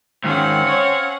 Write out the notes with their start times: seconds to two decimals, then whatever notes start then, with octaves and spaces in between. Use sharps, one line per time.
0.25 G#2 D#3 C4 C#4 F5 F#5
0.69 C#5